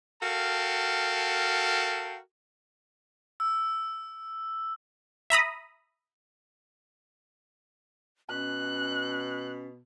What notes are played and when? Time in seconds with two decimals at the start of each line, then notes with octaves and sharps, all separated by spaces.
0.21 F#4 A4 A#4 F5 G5 A5
3.40 E6
5.30 E5 A#5 B5 D#6
8.30 B2 C#4 F#6